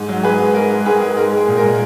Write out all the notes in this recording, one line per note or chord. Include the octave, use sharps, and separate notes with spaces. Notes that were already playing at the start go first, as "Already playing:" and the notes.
Already playing: G#2
F#3
G#2 G#4 B4
G#2
G#2 A#4
G#2 A#4
G#2 G#4 B4
G#2 G#4
G#3 A#4
G#3 G#4
A#2
A#4
A#2